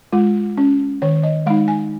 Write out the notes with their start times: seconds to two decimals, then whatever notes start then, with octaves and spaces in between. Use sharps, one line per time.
0.13 G#3 F4
0.57 C#4
1.02 D#3 C#5
1.23 D#5
1.46 G#3 D#4 F5
1.68 G#5